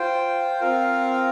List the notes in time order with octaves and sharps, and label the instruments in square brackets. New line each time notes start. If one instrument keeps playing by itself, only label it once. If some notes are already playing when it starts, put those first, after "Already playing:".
Already playing: [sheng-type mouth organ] F4 C5 G5
C4 F4 A#4 F5